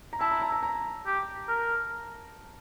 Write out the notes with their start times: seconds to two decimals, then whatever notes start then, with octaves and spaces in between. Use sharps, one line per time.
0.13 A#5
0.20 E4 A5
0.31 A#5
0.42 A#5
0.52 A#5
0.63 A#5
1.06 G4
1.48 A#4